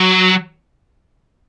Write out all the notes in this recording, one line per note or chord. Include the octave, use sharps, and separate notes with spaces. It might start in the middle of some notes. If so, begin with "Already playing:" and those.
Already playing: F#3